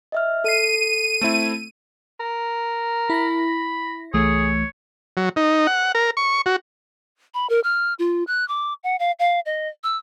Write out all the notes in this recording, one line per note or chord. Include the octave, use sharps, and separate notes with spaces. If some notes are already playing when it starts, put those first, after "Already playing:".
D#5 E5 F6
A4 C7 D#7
A3 C4 E4
A#4
E4 B5 A#6
C2 E3 A3 G#4 C#5
F#3
D#4
F#5
A#4
C#6
F#4
B5
A#4
F6
F4
F#6
D6
F#5
F5
F5
D#5
E6